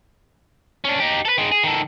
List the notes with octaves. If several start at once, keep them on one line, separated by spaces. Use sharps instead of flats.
C#4 D4
D#4 G4
A4 B4
D#3 G#3
G#4
D#3 A4